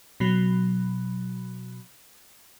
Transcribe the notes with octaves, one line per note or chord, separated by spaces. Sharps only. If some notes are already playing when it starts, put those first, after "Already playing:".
B2 F#3